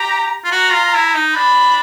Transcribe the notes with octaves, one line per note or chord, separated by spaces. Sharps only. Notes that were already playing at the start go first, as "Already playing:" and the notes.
Already playing: G4 A#5
F4
F#4 A#5
F4
E4
D#4
D4 B5